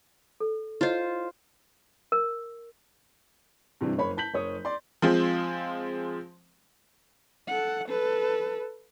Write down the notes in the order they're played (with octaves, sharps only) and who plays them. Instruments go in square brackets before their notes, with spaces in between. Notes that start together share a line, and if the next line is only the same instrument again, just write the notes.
[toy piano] A4
[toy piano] E4 C#5 D#5 [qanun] F4 C5
[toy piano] A#4
[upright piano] G2 C3 E3 G3
F#1 C#5 B5
A5 G6 B6 F#7
F#1 C#5 D#6
D5 C6
[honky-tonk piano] F3 G#3 C4
[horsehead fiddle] A4 F#5
A4 B4